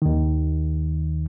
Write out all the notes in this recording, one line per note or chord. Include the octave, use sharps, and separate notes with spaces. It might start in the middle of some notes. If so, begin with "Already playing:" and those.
D#2 D#3